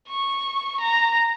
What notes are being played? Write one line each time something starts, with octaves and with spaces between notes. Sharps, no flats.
C#6
A#5